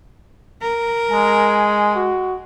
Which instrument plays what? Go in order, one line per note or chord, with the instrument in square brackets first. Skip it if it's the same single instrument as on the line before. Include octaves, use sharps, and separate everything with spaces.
[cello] A#4
[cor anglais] G#3 [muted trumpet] G#5
[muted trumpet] F#4